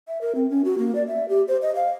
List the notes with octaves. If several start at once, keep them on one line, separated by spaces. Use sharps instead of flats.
E5
A#4
C4
C#4
F#4
A#3
D5
E5
G4
C5
D#5
F5